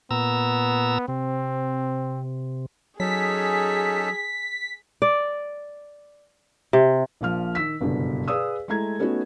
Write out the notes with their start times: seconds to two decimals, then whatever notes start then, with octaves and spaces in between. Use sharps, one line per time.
0.11 A#2 B3 A#5 E6
1.08 C3 C4
3.00 F#3 C#4 D#4 G#4 A4 B6
5.02 D5
6.73 C3
7.21 A#1 A#2 F3 F6
7.55 D#3 E6 B6
7.81 F#1 G2 B2 D3
8.28 G#4 B4 D5 F5 D#6 E6
8.68 G#3 A3 E4 A#5 G#6
8.99 A3 B3 C#4 D#4 F#4